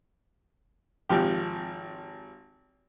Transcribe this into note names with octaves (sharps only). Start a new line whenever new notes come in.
G#1 C3 F3 G4